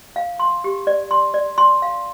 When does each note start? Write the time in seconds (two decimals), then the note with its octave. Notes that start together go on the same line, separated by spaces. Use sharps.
0.16 F5
0.40 C6
0.64 G4
0.87 D5
1.11 C6
1.34 D5
1.58 C6
1.82 F5